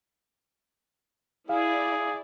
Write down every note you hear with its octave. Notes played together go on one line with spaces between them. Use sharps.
E4 G#4 D5 F5